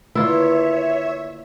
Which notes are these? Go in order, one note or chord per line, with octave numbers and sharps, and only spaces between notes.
D3 A#3 E4 F4 B4 C#5 E5